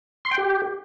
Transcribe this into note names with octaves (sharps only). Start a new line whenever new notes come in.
C6
G5
G4